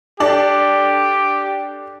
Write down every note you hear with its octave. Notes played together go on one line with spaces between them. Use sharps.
D4 G4 A4 D5